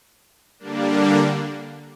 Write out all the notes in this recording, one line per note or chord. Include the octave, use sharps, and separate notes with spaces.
D3 G3 A#3 D4